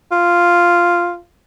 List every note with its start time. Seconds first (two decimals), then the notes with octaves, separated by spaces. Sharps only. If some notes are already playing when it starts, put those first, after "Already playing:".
0.12 F4